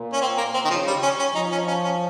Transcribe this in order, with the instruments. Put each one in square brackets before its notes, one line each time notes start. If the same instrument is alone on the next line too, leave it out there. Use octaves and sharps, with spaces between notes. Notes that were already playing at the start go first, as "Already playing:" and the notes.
Already playing: [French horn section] A#2
[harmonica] C#4
C4
A#3
C4
D#3
[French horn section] C#3 [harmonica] F3
[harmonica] G3
C#4
C#4
[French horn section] F3 [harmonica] D#4
[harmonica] C#4
C#4
C#4